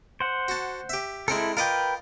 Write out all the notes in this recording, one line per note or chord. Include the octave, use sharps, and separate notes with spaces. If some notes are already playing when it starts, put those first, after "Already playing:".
C5 F#5
F#4 A5
G4 E5
G#3 C4 E4 A4 A#4
F4 A#4 B4 D#5 G5 D6